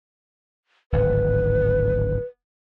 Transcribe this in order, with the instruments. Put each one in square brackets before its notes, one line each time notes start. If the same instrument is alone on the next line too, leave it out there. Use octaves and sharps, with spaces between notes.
[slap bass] D1 G#1 [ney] B4